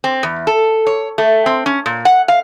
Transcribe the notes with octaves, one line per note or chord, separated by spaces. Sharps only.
C4
E2
A4
C#5
A3
C4
C#4
A#2
F#5
F5